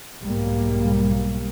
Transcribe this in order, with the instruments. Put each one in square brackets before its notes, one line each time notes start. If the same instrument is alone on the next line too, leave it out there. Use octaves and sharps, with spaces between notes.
[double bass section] B1 G#2 G3 A#3